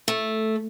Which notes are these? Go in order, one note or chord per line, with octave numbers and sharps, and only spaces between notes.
A3